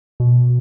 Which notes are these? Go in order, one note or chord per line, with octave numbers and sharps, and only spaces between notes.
B2